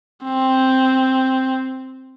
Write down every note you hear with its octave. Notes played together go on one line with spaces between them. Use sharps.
C4